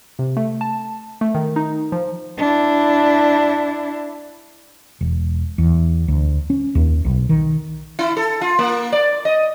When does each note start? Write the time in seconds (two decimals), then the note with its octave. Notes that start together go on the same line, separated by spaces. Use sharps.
0.19 C3
0.37 A3
0.61 A5
1.21 A3
1.35 D#3
1.56 D#4
1.92 F3
2.37 D4 E4
5.01 E1
5.58 E2
6.08 D2
6.50 C#4
6.75 D#2
7.05 B1
7.29 D#3
7.99 E4
8.17 A4
8.41 F4
8.59 A#3
8.92 D5
9.25 D#5